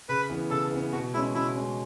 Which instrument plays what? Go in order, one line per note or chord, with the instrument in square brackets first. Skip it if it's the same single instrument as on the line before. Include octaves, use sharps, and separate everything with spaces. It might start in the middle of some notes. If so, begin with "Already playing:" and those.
[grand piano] C#3 [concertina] B4
[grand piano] E3 B3
[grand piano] C#3 [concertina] A4
[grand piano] E3 B3
[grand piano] B2 [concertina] F#4
[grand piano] G#3 [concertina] E4
[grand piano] C#4
[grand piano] B2 [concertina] E4
[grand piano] G#3 C#4